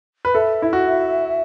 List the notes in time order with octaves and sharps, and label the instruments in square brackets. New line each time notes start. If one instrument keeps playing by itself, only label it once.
[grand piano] B4
[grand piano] A4 [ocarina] E5
[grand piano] E4
F#4